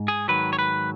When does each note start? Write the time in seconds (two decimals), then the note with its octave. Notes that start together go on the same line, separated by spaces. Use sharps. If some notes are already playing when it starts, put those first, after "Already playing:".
Already playing: G#2
0.08 G#4
0.28 G#2 D#3 F#3 B4
0.53 C#5
0.59 B4